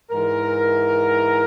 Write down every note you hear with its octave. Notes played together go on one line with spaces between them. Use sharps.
G#2 E3 A#4